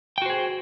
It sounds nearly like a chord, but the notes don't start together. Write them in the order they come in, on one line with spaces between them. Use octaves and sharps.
G5 F#4 C5 G#4